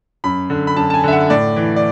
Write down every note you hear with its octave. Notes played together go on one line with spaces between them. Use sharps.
F#2 B5
D3
B5
F#2 A5
A5
G#5
D3 E5
F#5
A2 D5
E3
D5